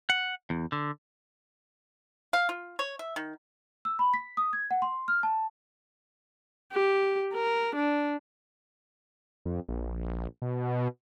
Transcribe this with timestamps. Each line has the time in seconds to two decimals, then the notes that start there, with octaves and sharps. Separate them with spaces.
0.10 F#5
0.50 E2
0.72 D3
2.33 F5
2.49 F4
2.79 C#5
2.99 E5
3.16 D#3
3.85 E6
3.99 B5
4.14 B6
4.37 D#6
4.53 G#6
4.71 F#5
4.82 C6
5.08 F6
5.23 A5
6.73 G4
7.34 A#4
7.75 D4
9.46 F2
9.69 A#1
10.42 B2